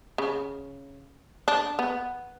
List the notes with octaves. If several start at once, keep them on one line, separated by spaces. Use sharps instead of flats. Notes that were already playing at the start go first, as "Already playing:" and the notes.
C#3
D4
B3